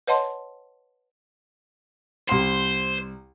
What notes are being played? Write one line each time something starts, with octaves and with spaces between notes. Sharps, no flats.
B4 C#5 D#5 F#5 A5 C6
C2 C5 C6